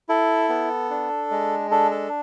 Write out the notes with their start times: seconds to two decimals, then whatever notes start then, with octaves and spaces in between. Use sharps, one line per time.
0.09 E4 A4
0.49 B3
0.90 D4
1.31 G#3
1.71 D4 A4
1.91 A4